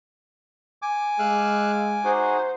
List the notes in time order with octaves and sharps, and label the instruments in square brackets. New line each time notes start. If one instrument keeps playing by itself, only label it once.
[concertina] G#5 D6
[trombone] G#3 [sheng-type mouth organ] F5 E6 F#6
[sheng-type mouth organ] D#4 F#4 G#4 [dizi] C5